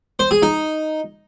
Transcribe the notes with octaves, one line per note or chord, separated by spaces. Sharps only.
C5
G#4
D#4